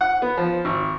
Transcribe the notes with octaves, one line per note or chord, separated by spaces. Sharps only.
F#5
B3
F3
G#1